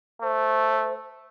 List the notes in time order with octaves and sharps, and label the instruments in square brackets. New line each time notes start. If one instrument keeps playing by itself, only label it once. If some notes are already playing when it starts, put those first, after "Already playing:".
[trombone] A3 [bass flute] C5